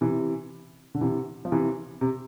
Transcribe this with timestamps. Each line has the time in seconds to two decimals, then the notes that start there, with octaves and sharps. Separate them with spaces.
0.01 C3 E3
0.95 D3
1.01 C3 E3
1.45 F3
1.52 C3 E3
2.01 C3